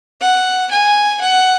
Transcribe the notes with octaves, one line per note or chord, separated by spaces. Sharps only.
F#5
G#5
F#5